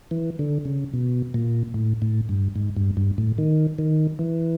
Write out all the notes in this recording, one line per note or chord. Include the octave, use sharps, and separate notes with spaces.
E3
D3
C#3
B2
A#2
A2
A2
G2
G#2
G2
G2
A2
D#3
D#3
E3